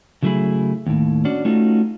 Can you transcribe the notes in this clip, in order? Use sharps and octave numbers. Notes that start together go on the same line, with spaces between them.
C#3 F#3 A3 E4 G#4 B5
D#2 A2
C#4 D4 F#4 D5
A3 C#4 D#4 F4 F#4